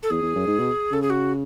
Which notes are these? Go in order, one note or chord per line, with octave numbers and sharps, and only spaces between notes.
A4
E2 G#4
E2
F#2
G#2
B2
C#3 A4
G#4
F#4